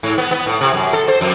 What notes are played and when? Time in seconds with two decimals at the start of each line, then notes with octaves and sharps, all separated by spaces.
0.03 G#2
0.18 B3
0.31 B3
0.46 A2
0.61 C3
0.73 F#2
0.93 A4
1.08 C5
1.21 F2